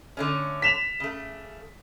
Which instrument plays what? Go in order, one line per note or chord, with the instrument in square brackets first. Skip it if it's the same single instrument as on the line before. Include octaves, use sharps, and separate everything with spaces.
[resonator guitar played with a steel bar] D3 A3 C#4
[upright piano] B6 E7 F7
[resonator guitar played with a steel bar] C#3 A3